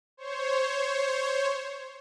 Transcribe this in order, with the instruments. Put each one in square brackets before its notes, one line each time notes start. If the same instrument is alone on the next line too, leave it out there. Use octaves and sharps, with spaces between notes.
[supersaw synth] C5 C#5